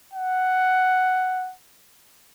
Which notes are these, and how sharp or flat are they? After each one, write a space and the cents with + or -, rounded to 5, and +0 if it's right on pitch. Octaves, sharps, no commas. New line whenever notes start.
F#5 +5